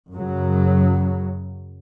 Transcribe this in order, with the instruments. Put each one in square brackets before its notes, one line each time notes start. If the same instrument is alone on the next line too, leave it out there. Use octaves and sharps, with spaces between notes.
[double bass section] F#2 C#3 F#3